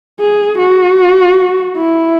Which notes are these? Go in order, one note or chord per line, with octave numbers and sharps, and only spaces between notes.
G#4
F#4
E4